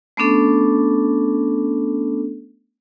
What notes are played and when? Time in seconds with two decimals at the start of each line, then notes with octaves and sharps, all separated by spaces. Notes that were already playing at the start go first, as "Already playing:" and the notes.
0.17 A3 B3 C#4 D4 A4